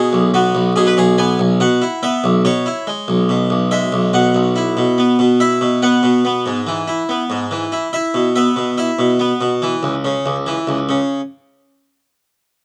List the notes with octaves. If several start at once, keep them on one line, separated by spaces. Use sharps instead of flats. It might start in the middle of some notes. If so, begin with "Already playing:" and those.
Already playing: B2 G#4
B1
B3 F#4
B1
B2 G#4
B4
B1 G#4
B3 G#5
B1
B2 F#5
E4
B3 E5
B1
B2 C#5
E4
G#3
B1
B2
B1
G#3 E5
B1
B2 F#5
B1
E4
B2
B3
B2
E4 E5
B2
B3 F#5
B2
B3
G#2
E3
E4
B3
G#2
E3
E4
E4 E5
B2
B3 E5
B2
E4 E5
B2
B3
B2
E3
C#2
C#3
C#2
E3
C#2
C#3